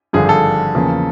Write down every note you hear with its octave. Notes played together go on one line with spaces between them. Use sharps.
G#1 G2 D3 F3 G#4
A4
E2 C#3 F3 A#3